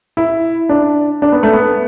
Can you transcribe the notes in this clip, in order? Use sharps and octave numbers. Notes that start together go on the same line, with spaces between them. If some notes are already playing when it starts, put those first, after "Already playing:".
E4
D4
D4
B3
A3
B3